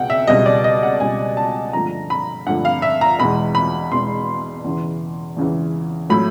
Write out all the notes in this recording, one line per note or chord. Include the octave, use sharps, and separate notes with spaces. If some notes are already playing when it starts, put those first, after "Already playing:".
Already playing: C#2 B2 F#5 G5
E5
C#2 B2 G3 D#5
D5
D#5
F#5
C#2 B2 G3 G#5
A5
G2 D3 F3 A3 A#5
B5
G2 D3 F3 A3 F#5
F5
E5
A#5
E2 B2 G#3 B5
B5
E2 B2 G#3 C6
E2 C#3 E3
E2 C#3 E3
A2 F#3 A3 B5